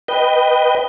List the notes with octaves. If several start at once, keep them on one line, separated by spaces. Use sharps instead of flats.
B4 D#5 G5